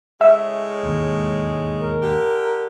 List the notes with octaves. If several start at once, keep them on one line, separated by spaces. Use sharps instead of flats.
A2 C#3 G#3 E5
E1 D#2 G#2
A#4
D3 G4